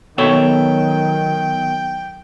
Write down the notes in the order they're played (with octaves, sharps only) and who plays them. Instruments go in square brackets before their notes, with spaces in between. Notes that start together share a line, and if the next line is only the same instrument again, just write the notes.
[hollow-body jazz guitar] B2 A4 C#5 [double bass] D#3 F#3 [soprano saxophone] G5